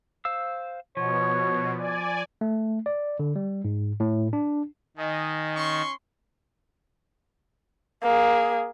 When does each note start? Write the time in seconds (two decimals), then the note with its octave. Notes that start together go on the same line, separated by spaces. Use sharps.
0.25 C5 F5 E6
0.97 B2 F3 C#5
1.77 D5 G#5
2.41 A3
2.86 D5
3.19 D3
3.36 G3
3.65 G#2
4.00 A2
4.33 D4
4.97 D#3 D#5 G#5
5.57 C#4 C6 C#6
8.03 A#3 G#4